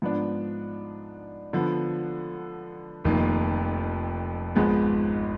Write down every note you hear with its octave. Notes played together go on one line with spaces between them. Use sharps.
G#2 F3 B3 D4
D3 F3 B3
F1 F2 D#3 A#3
G#1 G#2 F3 G#3 B3